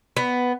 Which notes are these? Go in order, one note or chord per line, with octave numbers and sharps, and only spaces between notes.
B3